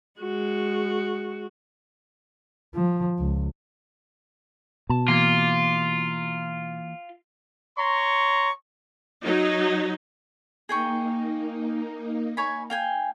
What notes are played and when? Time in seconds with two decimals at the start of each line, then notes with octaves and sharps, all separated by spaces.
0.20 G#3 F#4
2.74 F3
3.19 C#2
4.90 B2 A5
5.08 E3 A#3 F4
7.78 C#5 A#5 C6 C#6
9.24 F#3 D#4
10.69 A#3 D#4 G#4 G5 C#6
12.37 C#5 G#5 B5
12.70 F5 G5 G#5